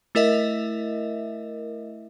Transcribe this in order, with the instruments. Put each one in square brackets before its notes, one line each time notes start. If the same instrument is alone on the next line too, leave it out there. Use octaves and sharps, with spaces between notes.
[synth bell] A3 E4 A#4 D#5 E5